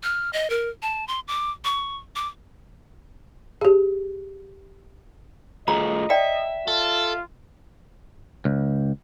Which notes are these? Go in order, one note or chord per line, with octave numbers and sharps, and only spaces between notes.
F6
D#5
A#4
A5
C6
D6
C#6
D6
G4 G#4
A3 F4 G#4 D#5 A#5
D5 E5 G5
F4 A4
C#2